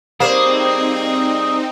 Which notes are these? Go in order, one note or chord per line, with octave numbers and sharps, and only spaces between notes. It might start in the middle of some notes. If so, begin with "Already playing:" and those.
G3 A#3 C4 D#4 G#4 C5 D5